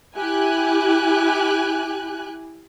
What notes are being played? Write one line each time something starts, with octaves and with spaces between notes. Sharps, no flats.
E4 G4 G#5 F#6